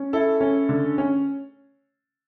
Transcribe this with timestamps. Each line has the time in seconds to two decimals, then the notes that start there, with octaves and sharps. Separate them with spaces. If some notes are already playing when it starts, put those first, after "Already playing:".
Already playing: C#4
0.13 E4 A4
0.41 C#4
0.69 D3
0.98 C#4